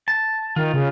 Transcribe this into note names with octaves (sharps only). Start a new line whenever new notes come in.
A5
D#3 F4
C#3